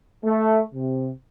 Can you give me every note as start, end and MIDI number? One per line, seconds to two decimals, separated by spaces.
0.24 0.60 57
0.74 1.09 48